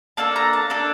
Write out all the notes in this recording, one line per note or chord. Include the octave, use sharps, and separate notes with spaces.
A#3 D4 A4 A5
A#5
A5
A#3 D4 A4 A5